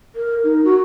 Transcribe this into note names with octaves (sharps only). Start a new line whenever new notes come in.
A#4
D#4
F#4